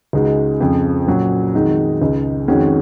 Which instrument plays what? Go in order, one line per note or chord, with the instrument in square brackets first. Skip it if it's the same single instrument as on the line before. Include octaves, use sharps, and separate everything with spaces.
[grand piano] C#2 C#3 G#3 D#4 F#4
F2 C#3 F3
A#2 F#3 C#4 F#4
F2 D#3 G#3 D#4 F#4
C#2 C#3 G#3 D#4
F2 D#3 G#3 C#4 F#4